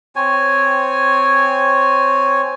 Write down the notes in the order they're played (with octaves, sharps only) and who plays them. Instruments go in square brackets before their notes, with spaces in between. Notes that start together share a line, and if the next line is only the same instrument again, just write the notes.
[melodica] C4 C#5 G#5